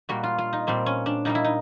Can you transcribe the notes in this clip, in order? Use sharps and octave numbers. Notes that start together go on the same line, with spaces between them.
A#2 G3 A#3 F#4
F4
F4
D#4
A#2 G3 A#3 C4
C#4
D4
A#2 G3 A#3 D#4
E4
D#4